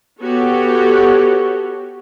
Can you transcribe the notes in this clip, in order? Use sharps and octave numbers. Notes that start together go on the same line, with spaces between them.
B3 F#4 G4 A4 C#5